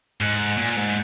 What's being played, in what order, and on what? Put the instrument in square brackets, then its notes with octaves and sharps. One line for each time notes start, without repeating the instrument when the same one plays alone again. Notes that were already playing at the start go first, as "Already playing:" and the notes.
[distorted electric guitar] G#2 [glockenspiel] F#6 C#7 F#7
[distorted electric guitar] A#2 [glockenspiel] G#5
[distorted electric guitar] G#2